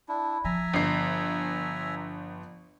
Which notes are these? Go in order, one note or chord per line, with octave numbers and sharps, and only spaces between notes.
D4 E4
F3 E5 G#5 A#5
G1 C7